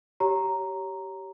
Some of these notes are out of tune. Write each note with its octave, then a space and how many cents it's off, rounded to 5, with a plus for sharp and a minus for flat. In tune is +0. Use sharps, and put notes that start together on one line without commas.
G4 -15 C#5 +0 A#5 +0